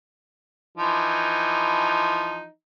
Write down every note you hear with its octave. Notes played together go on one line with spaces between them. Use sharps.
E3 F3 D#4